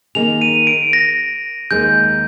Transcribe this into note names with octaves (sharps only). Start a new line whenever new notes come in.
D#3 A#3 D#4 G#4 F7
D#7
D7
A#6
D#2 D#3 G#3 D#4 G#4 G6